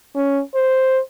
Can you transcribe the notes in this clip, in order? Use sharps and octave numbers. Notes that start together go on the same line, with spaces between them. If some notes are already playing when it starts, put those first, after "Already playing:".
C#4
C5